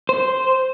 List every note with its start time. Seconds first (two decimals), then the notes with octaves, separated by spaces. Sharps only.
0.09 C5